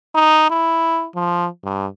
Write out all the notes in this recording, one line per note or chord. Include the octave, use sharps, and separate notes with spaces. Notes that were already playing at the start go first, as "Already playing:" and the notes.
D#4
E4
F3
G2